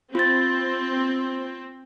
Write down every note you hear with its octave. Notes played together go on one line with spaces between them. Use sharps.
C4 F4 A6